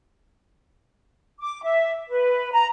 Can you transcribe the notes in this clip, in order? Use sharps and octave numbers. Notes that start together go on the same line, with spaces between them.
D6
E5
B4
A#5